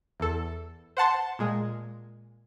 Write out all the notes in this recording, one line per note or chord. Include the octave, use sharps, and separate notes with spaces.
E2 A4
C5 F#5 A5 C6
A#2 G#3